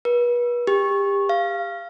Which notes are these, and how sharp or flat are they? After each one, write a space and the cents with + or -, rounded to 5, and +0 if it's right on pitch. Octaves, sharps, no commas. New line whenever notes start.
B4 -35
G4 +30
F5 -15